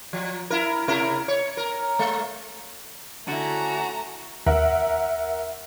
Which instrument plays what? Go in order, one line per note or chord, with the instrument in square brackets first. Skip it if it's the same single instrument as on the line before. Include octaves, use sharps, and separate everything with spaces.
[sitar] F3
E4 A#4
C3 E4 A#4
C#5
A#4
G#3
[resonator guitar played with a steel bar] D3 E4 [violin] A3 A#5 [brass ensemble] C#4 D4 G#5 [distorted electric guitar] F#4
[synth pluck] D#2 [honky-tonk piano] A#4 E5 F#5